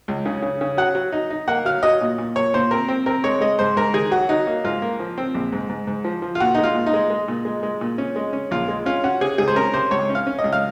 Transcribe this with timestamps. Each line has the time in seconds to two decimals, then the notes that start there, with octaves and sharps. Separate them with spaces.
0.08 C#2
0.25 C#3
0.42 C#3
0.61 C#3
0.77 F#3 F#5
0.95 F#3
1.12 D#4
1.30 D#4
1.48 A#3 F#5
1.65 F#3 F5
1.83 F#3 D#5
2.01 A#2
2.18 A#2
2.36 A#2 C#5
2.54 A#2 C5
2.71 C4 A#4
2.88 C4
3.06 C4 A#4
3.24 G#3 C#5
3.41 G#3 D#5
3.59 G#2 C5
3.76 G#2 A#4
3.94 D#3 G#4
4.11 F#3 F#4
4.29 F#3 D#4
4.47 A#3
4.64 G#2 F4
4.82 A#3
5.00 F3
5.18 C4
5.35 A#1
5.52 G#2
5.69 G#2
5.87 G#2
6.04 F3
6.22 F3
6.35 F4
6.40 A#2 F#4
6.55 G#3 D#4
6.64 F4
6.75 A#2
6.86 D#4
6.93 G#3
7.10 G#3
7.28 A#2
7.45 G#3
7.63 G#3
7.81 A#2
7.98 C#4
8.16 G#3
8.33 C#4
8.51 A#1 F4
8.68 G#3
8.86 C#4 F4
9.04 C#4 F#4
9.21 C3 G#4
9.38 C#2 G#4
9.48 C5
9.56 C#4 A#4
9.73 C3 C5
9.91 C#2 C#5
10.10 C#4
10.15 F5
10.27 C#4
10.39 D#5
10.44 C#2
10.53 F5